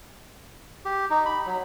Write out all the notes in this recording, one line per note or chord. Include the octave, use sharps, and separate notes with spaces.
G4
D#4
B5
F#3